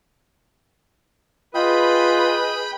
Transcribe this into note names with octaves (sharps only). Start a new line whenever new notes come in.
F4 G#4 B4 D#5 G5 B5